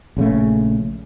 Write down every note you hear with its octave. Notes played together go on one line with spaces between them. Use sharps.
A#1 C#3 A3